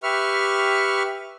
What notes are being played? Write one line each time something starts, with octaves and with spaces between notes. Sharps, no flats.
G4 B4 E5 C#6 F6